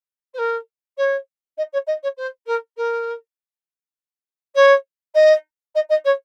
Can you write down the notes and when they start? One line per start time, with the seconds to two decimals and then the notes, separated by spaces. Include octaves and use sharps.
0.33 C5
0.38 A#4
0.97 C#5
1.57 D#5
1.72 C#5
1.87 D#5
2.03 C#5
2.17 C5
2.46 A#4
2.76 A#4
4.55 C#5
5.14 D#5
5.75 D#5
5.89 D#5
6.04 C#5